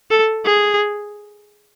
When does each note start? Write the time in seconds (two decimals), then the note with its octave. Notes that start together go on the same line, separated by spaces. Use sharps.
0.11 A4
0.45 G#4